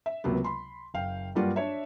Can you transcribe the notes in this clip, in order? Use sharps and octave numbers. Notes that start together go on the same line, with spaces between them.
E5
C#2 C3 F#3 A#3 B3
B5 C6
F#1 F5 G5
G2 F#3 G3 A#3 F4 F#4
D4 C#5 E5